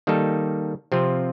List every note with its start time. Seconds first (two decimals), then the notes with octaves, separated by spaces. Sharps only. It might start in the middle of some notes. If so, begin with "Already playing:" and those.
0.07 D#3 G3 A#3 D#4 A4
0.92 C3 F3 C4 F4